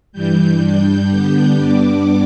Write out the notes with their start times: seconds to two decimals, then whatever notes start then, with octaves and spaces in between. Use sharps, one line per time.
0.12 G2 E3 G3 G6
0.61 G2 G3 D4
1.08 D3 G3 B3 D4 G6
1.56 G2 G3 B3 D4 D6